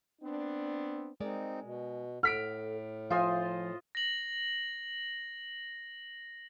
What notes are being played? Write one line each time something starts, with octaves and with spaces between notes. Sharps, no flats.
B3 C4 D4
G#3 C4 D#4 A#4 D5
B2
A2 A4 F#5 F6 B6 D7
F3 F4 C5 D#5 E5 G#5
A#6 F#7